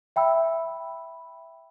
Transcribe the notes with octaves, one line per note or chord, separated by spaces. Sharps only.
E5 G5 B5 E6